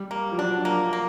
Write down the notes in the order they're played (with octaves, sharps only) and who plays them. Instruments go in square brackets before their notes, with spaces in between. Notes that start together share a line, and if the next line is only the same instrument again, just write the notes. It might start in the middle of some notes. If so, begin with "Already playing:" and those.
Already playing: [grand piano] G3
[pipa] A#3
[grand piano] F3
[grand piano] F#3 [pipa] D4
[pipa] A#3
A#3